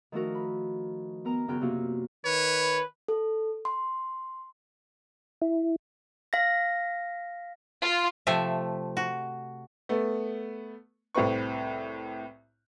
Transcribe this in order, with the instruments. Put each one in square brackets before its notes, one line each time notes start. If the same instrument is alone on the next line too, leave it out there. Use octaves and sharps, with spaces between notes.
[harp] D#3 F3 A3 F#4 A#4
B5
B3 A#4 A#5
F#2 C#3 B3 G5 F6 F#6
F#2 C3 A#3 F4 F#4
[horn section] D#3 B4 [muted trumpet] C#5
[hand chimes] A4
C6
[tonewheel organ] E4
[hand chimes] F5 A#6
[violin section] F4
[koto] C3 F3 A3 E5
F#4
[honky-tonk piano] A3 B3
C2 A2 C4 B4 C#6